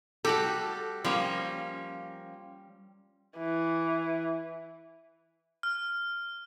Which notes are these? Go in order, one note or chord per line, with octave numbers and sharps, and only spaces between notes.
G3 F#4 G4 A4
F3 G3 A#3 C#4
E3
F6